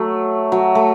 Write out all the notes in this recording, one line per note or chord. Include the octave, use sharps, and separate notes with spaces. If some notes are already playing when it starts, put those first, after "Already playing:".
Already playing: F#3 A3
F#3
A3